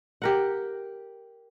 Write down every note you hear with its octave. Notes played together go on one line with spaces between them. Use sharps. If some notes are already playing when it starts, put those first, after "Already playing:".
G4 A#4 F#5